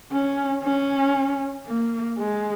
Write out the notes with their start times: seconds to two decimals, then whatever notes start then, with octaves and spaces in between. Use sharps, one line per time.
0.12 C#4
0.63 C#4
1.66 A#3
2.18 G#3